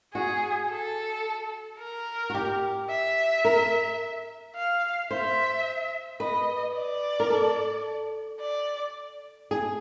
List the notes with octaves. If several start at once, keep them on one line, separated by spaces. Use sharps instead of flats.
F#4 G#4
A4
A#4
F#4
G4
E5
A#4
F5
C5 E5
B4 D#5
D5
A#4
A4
D5
G#4